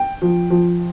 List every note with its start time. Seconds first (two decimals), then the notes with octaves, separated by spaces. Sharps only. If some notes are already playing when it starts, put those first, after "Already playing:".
Already playing: G5
0.22 F3
0.50 F3